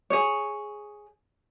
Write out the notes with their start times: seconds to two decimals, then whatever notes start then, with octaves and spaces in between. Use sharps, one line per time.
0.10 G#4 C#5